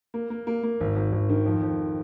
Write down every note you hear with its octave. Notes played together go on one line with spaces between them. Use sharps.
A#3
A#3
A#3
A#3
G#1
G#1
G#1
D#3
F2
F2